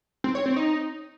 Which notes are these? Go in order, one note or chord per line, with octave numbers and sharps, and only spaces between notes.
C4
C#5
C4
D#4